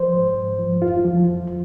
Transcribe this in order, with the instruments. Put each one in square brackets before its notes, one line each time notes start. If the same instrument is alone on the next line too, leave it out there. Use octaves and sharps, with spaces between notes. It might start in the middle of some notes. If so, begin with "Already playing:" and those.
Already playing: [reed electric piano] F3 C5
G#2
G#2
F3
F2 F4
F3
F2